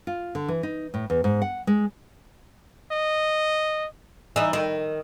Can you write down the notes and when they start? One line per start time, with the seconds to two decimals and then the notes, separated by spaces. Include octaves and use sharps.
0.07 F4
0.35 D3
0.48 E3
0.63 D#4
0.94 A2
1.10 E2
1.24 G#2
1.42 F#5
1.67 G#3
2.92 D#5
4.36 E3 D#4
4.53 D#3